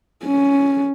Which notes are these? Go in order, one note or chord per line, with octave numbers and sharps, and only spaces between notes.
C#4